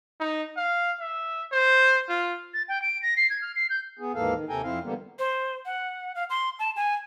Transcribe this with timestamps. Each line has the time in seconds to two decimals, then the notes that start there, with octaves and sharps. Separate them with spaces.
0.20 D#4
0.57 F5
1.00 E5
1.52 C5
2.09 F4
2.54 A6
2.68 G5
2.82 D7
3.03 A#6
3.17 C7
3.30 G#6
3.42 F6
3.56 C7
3.70 G6
3.99 B3 G#4
4.15 D#2 G#2 E3 A#3 A4 F5
4.34 D#3
4.49 D#2 C3 A4 G5 G#5 A#5
4.63 F2 C4 E4 F5
4.83 D3 E3 G3 A#3 B3
5.19 C5
5.66 F#5
6.15 F5
6.30 C6
6.59 A5
6.76 G#5